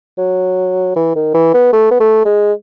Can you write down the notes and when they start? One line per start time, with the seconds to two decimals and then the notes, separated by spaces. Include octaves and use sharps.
0.18 F#3
0.96 E3
1.15 D#3
1.34 E3
1.54 B3
1.73 A3
1.91 B3
2.00 A3
2.26 G#3